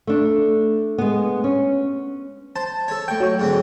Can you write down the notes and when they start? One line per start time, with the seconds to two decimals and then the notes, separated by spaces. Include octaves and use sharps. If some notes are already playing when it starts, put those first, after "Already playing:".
0.07 A3 D4
0.98 G#3 B3
1.44 C#4
2.56 C5 A5
2.88 A4 C#5
3.08 A2 G5 C#6
3.21 F#3 C#5
3.39 G#2 D3 C4